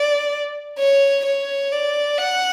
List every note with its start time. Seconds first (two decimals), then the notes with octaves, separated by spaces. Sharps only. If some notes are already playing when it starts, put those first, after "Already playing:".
Already playing: D5
0.79 C#5
1.25 C#5
1.72 D5
2.18 F#5